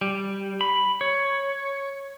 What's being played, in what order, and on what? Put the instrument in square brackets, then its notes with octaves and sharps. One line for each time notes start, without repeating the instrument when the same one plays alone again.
[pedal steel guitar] G3
B5
C#5